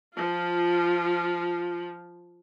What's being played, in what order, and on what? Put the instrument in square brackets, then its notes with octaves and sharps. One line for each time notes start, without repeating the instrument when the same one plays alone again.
[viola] F3 F4